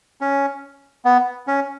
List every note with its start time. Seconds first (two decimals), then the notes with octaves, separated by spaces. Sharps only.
0.21 C#4
1.05 B3
1.47 C#4